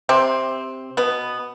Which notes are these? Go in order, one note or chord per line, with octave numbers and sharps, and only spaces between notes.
C3 C4
B2 B3